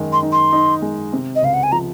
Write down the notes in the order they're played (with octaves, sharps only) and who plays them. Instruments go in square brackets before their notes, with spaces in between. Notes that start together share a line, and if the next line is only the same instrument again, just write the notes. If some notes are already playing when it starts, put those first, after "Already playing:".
Already playing: [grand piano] F#2 D#3 G#3
[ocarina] C6
[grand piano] D#4
[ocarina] C6
[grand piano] D#4
G#3
C3
[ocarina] D#5
[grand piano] C#2 [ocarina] F5
[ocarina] F#5
G#5
[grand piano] F3 [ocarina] A#5